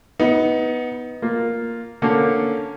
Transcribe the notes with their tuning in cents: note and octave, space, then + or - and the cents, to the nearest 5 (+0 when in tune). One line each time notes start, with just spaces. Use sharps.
B3 +0 D#4 +25
A#3 +0 F4 +0
D3 +0 A#3 +0 C#4 +0